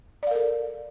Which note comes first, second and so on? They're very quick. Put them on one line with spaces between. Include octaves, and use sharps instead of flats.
D5 F5 A#4 A4